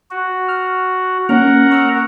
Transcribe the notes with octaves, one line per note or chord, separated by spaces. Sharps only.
F#4
F6
A#3 C#4 A#4 F#5 A#5
C#6 E6 F6